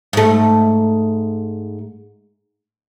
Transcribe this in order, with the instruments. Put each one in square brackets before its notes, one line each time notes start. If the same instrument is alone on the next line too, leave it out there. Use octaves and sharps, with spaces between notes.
[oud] G#2 A3